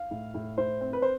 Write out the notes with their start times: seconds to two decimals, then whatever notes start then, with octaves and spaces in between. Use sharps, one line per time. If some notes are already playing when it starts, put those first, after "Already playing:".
Already playing: F5
0.11 A2
0.34 A2
0.58 A2 C5
0.81 C4
0.93 B4
1.02 C5